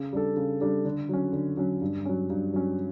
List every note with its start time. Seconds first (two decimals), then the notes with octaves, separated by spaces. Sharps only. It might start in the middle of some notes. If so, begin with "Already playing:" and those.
Already playing: C#3
0.13 G3 D4 A4
0.36 C#3
0.61 G3 D4 A4
0.85 D3
1.09 F#3 C#4
1.33 D3
1.57 F#3 C#4
1.81 G2
2.05 F#3 C#4
2.30 G2
2.53 F#3 C#4